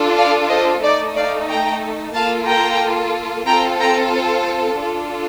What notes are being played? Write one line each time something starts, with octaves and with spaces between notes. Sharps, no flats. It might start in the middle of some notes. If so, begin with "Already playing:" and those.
Already playing: D4 F4 A4
D5 F5
C5 D#5
A3 D#4 A4 D5
D5 F5
G5 A#5
A#3 F4 A4 F5 A5
G5 A#5
C4 F4 A4 G5 A#5
G5 A#5
C5
D4 F4 A4